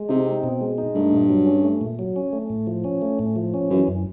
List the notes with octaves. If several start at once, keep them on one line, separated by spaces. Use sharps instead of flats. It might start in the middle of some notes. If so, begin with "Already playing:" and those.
Already playing: G#3
C3 D#4
C4
B2
G#3
D#4
G2 A3
A#2
F#3
C#4
A3
A#2
F#3
C#4
A3
A2
F3
C#4
A3
A2
F3
C#4
F#2 E3
F#2